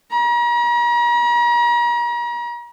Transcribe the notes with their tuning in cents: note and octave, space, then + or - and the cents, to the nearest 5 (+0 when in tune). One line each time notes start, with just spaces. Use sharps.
A#5 +40